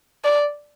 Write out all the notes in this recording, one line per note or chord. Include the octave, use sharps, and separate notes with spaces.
D5